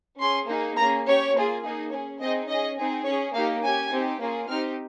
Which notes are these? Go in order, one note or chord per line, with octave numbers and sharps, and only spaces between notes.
C#4 G#4 C6
A#3 D#4 G#4
A#3 C#4 G#4 A#5
C#4 G4 C#5
A#3 F4 G#4
A#3 D#4 G#4
C#4 G#4 C#5
C4 D#4 G#4 D#5
C#4 G#4 D#5
C4 D#4 G#4
C#4 G#4 C#5
A#3 D#4 G4 F5
C#4 G4 G#5
C4 D#4 G4
A#3 C#4 F4 G#4
C4 D#4 G4 F6